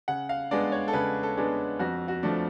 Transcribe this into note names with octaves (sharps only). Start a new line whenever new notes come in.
C#3 F#5
F5
G#3 B3 D4 D5
C#5
A4
C#3 B4
A4
G#3 B3 D4
F2 F#4
F#4
F3 A3 D4